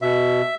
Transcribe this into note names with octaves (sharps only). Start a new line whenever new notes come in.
B2 E5